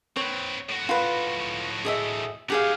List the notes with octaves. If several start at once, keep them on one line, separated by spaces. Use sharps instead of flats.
C4 B4 C#5
A2 F#4
F4 B4
G#4 D#5 E5
D#4 G4 G#4 F5 F#5